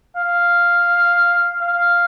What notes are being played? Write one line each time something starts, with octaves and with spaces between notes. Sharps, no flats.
F5
F5